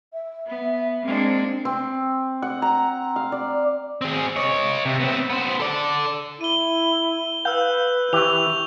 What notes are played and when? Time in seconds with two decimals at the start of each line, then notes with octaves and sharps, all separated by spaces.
0.13 E5
0.47 B3
1.03 G#3 A#3 C4 D4
1.65 C4
2.42 F#5
2.62 A#5
3.16 F5
3.32 D5
4.01 C4 G#4
4.36 C#5 D#5
4.85 C3
5.00 B3 C4
5.30 B3 C5
5.60 A4 D5
6.41 E4 D#7 G7
7.45 B4 F5 E6 G6
8.13 E3 G4 C#6 F7